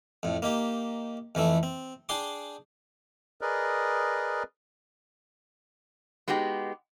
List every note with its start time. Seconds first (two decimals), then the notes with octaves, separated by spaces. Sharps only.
0.23 F2 A2
0.42 A#3 D#4 G4
1.35 F2 E3 A3 E4
1.63 C4
2.09 D4 G#4 G5 C6 D6
3.41 G#4 A#4 B4 D5 D#5
6.28 G#3 B3 D#4 F#4 G4